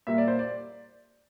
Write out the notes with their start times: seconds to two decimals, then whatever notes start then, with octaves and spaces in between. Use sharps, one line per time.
0.07 A#2 G3 A#3 E5
0.18 D5
0.28 C5
0.39 D5